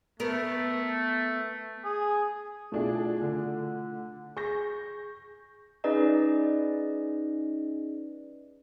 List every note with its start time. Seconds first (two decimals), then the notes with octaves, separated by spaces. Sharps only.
0.20 A3 B3 A#4
1.84 G#4
2.72 B2 A3 D4 E4 F4 G#4
3.22 D3
4.37 G#4 C#6 G6 A#6
5.84 C#4 D#4 G#4 B4 D5 D#5